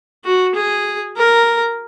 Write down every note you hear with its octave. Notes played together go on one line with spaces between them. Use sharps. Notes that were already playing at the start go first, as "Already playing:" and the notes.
F#4
G#4
A#4